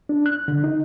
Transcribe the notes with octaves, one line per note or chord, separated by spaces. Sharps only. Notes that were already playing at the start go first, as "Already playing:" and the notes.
D4
F#6
D3
D#4